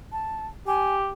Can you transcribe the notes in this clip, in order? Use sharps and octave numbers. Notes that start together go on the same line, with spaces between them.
A5
G4 G#5